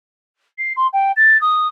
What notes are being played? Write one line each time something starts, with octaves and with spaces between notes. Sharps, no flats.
C7
C6
G5
A6
D#6